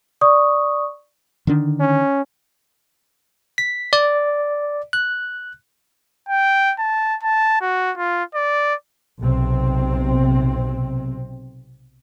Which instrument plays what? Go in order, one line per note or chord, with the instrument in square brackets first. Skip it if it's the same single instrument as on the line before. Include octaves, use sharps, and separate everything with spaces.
[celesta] D5 C#6 D#6
[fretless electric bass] D3 D#3 D4
[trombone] C#4
[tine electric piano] B6
D5
F#6
[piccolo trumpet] G5
A5
A5
F#4
F4
D5
[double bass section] B1 C3 C4